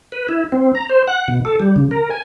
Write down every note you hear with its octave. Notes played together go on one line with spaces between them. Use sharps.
B4
E4
C4
A#5
C5
F#5
B2
A4
G3
C#3
A#4
G#5